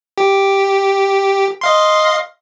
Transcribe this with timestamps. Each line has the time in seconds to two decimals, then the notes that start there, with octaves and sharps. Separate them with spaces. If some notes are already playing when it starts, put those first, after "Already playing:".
0.18 G4
1.61 D#5 F5 C6